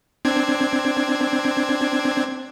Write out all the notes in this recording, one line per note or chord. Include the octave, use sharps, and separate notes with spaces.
C4 D4 G#6